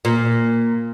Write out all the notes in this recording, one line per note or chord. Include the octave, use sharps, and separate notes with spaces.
A#2